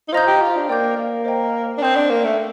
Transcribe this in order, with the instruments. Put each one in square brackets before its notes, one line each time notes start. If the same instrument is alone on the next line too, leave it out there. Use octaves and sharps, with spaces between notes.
[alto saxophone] D#4
[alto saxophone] F4 [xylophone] C5 D#5 A#5 D#6 G6
[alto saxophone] G4
F4
D4
[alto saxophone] A#3 [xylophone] D5 G5 D6 G6
[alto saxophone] A#3
[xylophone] C5 D#5 G5 A#5
[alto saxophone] D4
[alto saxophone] C4 [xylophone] A#4 D#5 A5 D#6 G6
[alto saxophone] D4
A#3
A3